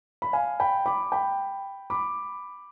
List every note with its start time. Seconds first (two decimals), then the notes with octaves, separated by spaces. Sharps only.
0.22 B5
0.33 F5 G#5
0.60 G5 B5
0.86 B5 D6
1.12 G5 B5
1.90 B5 D6